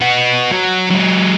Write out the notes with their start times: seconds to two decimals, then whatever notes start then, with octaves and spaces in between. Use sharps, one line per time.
0.01 B3 F#4
0.51 F#3
0.90 F#3 G#3